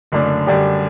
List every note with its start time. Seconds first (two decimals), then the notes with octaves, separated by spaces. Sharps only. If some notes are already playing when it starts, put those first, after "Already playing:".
0.12 F#1 F#2 D3 A3 D4
0.47 F#2 D3 G3 D4 G4